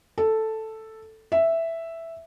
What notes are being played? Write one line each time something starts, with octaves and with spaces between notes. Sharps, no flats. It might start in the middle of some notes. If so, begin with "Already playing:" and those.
A4
E5